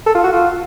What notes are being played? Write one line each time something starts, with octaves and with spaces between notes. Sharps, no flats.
A4
F4
F#4
F4